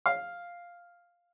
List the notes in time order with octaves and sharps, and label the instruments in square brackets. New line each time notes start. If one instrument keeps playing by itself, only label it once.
[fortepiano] F5